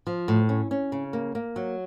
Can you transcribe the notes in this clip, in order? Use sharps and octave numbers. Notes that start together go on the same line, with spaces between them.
F3
A2
C#4
C#4
C#3
A#3
A#3
F#3